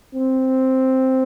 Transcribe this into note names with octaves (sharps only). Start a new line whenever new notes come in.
C4